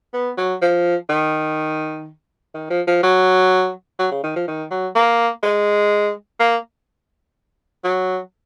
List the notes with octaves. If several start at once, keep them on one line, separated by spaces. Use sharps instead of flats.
B3
F#3
F3
D#3
D#3
F3
F3
F#3
F#3
C#3
D#3
F3
D#3
F#3
A#3
G#3
A#3
F#3